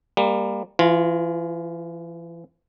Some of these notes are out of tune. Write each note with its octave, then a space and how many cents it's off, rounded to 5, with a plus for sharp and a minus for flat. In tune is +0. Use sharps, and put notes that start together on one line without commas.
G3 +25 A#3 +0
E3 +35 F4 +5